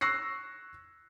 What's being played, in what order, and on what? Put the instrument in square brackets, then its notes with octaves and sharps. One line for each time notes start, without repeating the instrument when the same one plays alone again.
[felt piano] C#6 E6 F#6 A#6 C7